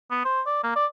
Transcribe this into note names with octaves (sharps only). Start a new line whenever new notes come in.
B3
C5
D5
A#3
D5